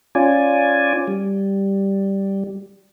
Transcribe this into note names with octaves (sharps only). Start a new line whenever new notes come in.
C#4 F4 D5 G#5
G3